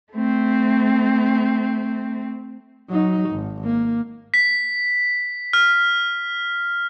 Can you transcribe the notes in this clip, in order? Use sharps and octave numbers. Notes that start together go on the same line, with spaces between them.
A3 C4
F#3 D#4
G#1
A#3
B6
F6